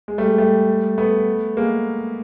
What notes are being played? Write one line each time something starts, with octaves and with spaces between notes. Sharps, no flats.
G#3
G3 A3
G#3
G3 A3
A3 B3
G#3 A#3